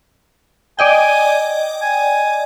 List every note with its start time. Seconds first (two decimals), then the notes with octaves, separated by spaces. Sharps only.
0.79 D5 D#5 G5 G#5
1.82 G#5